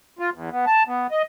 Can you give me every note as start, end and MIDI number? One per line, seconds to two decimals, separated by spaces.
0.19 0.30 65
0.34 0.50 40
0.51 0.65 59
0.67 0.83 81
0.87 1.07 59
1.11 1.22 75